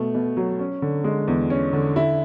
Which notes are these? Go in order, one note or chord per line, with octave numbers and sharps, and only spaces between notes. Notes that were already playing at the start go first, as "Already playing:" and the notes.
Already playing: B2 A3
B2
F#3
C#4
D3
G#3
E2
C#4
D3
E4